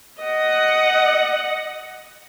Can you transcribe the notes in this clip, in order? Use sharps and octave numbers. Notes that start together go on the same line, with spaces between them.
D#5 F#5